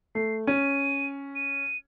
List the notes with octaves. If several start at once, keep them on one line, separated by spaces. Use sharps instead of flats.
A3 C7
C#4 D#7
D#7